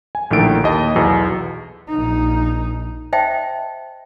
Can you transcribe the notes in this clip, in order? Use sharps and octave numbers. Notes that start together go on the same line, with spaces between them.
G#5
A#1 A2 D3 D#3 A4 D7
D#2 D#5 A5
B1 E2 B2
A#1 D#4
C5 D#5 E5 G5 A5